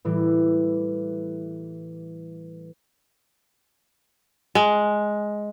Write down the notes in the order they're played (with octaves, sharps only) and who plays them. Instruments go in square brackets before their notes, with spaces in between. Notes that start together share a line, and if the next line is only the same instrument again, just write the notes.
[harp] A2 E3 G3
[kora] G#3